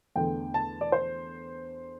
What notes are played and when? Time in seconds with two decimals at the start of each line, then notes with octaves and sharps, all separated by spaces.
0.15 E2 D3 A3 G5
0.54 A5
0.81 D5
0.92 C5